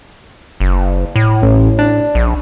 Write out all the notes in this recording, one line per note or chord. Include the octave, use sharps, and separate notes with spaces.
F#1
A2
A1
D4
A#1